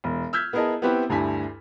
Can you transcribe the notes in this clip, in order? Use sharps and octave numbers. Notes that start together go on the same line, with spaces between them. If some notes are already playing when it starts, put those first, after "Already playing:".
E1
E6 F6 G6 G#6 B6
B3 E4 G#4 A#4 D#5 A5
B3 C4 E4 G4 B4
D2 G2 E4 G#5 B6